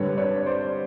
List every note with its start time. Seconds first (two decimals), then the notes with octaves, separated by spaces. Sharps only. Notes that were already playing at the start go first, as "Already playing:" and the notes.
Already playing: G2 D3 G3 B4 C#5
0.18 B4 C#5
0.46 C5 D5